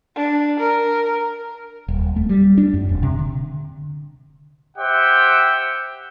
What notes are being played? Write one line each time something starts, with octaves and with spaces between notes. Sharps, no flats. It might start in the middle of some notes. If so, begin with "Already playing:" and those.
D4
A#4
D#1
A3
G3
D4
F#2
D#1
C3
D3
G4 C5 E5 F#5 G5